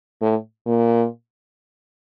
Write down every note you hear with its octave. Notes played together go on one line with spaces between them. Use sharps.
A2
A#2